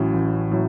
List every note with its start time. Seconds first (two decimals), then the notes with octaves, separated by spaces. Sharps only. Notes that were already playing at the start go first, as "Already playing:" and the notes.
Already playing: A1 A2 F#3 C#4
0.13 A1
0.51 A2 F#3